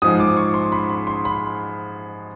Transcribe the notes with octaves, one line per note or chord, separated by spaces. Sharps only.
G#2 F3 G#3 D#6
D6
C#6
C6
B5
B5
C6
B5